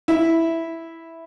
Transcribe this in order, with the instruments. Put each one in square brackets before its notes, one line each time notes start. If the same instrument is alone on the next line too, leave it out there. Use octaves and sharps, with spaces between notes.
[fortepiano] E4 E5